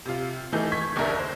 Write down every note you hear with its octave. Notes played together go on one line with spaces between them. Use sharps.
C3 F4
A2 E3 A3 D#4 G#4 G6
C#6 G#6 B6
F#1 D#2 D4 A#4 E5
C5